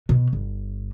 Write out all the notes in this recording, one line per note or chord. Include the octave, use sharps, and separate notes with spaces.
B2
G1